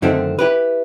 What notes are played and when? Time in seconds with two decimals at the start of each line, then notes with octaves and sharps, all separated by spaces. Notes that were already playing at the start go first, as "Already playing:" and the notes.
0.02 F#2 D3 D#3 A3 C4
0.39 E4 G4 B4